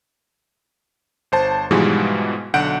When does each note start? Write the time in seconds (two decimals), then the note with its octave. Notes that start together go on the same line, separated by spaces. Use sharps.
1.32 G1 C5 A5
1.71 G#2 B2 E3 F3 G3 G#3
2.54 B1 D3 F#5 G6 D7